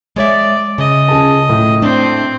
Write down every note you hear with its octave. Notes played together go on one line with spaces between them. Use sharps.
G#3 C#5 D5 E5
C#3 D#5
C#2 G#4 A5
A2
A3 C4 D4 C5